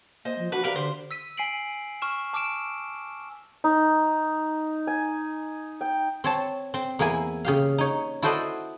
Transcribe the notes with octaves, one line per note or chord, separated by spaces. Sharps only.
A#3 C5 D#5 G#5
F3
D4 F#4 B4 F#5
E2 G4 A#4 B4 F5
D3 C5 C6
E6 B6 D#7
G#5 B6 C7 D7 F#7
C#6 F6 E7
A5 D6 E6 F6 D7 E7
D#4
G#5
G5
C4 C#5 A5
C4
E2 A#3 E4 G#5
C#3 G4 F5
D#4 C#5
E4 F#4 A4 C5 D5 D#5